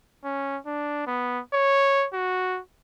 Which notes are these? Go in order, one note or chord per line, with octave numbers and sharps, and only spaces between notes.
C#4
D4
B3
C#5
F#4